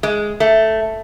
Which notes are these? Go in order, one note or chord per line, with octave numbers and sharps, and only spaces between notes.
G#3
A3